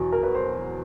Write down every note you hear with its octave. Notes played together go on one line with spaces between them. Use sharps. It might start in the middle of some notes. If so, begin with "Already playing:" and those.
Already playing: E2 B2 F#3
A#4
B4
C5